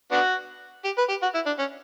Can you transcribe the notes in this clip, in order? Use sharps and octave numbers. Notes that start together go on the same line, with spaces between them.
B3 D4 F#4
G4
B4
G4
F#4
E4
D4
C#4